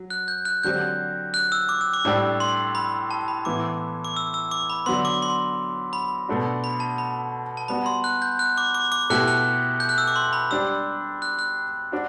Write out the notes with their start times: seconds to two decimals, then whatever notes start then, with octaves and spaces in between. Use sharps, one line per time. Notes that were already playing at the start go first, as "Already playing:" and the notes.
Already playing: F#3
0.10 F#6
0.28 G6
0.45 F#6
0.63 D3 F#3 C4 G4 G6
1.34 F#6
1.52 E6
1.69 D6
1.81 E6
1.93 D6
2.05 A2 G3 D4 G4
2.40 C6
2.75 B5
3.11 A5
3.28 B5
3.45 A2 E3 B3 E4 D6
4.05 D6
4.17 E6
4.34 E6
4.51 D6
4.70 B5
4.86 D3 F#3 B3 C6
5.05 D6
5.22 C6
5.93 B5
6.28 B2 A3 D4 F#4
6.64 B5
6.80 A5
6.98 B5
7.57 A5
7.68 G3 B3 F#4 B5
7.86 C6
8.04 F#6
8.22 G6
8.39 F#6
8.58 D6
8.75 D6
8.92 D6
9.10 B2 A3 E4 G4 F#6
9.28 F#6
9.80 G6
9.89 F#6
9.98 E6
10.07 D6
10.16 C6
10.33 B5
10.51 G3 D4 G4 E6
11.22 F#6
11.39 F#6
11.92 D4 F#4